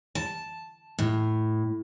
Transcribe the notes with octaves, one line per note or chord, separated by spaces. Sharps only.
A5
A2